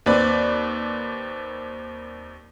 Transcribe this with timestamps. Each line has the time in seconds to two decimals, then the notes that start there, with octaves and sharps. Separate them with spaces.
0.06 D#2 C4 B4 D5